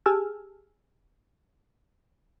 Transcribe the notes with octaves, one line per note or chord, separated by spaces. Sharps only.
G4 G#4 G#5 A5 E6 F6